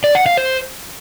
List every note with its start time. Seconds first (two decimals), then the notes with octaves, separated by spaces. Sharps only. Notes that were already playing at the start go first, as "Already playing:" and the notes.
0.04 D5
0.15 F#5
0.26 F5
0.37 C5